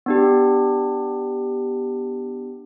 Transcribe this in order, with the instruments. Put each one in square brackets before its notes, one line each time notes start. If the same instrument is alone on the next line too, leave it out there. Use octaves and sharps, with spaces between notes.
[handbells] B3 D4 G4